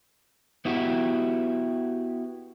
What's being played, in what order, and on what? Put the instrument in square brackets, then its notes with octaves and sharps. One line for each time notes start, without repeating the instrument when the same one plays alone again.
[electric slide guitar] B3 E4 F#4 G4